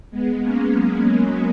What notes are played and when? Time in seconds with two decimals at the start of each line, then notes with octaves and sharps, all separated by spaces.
0.11 G#3 B3
0.40 A#3 C#4
0.71 F#3 A#3
1.16 F#3 A#3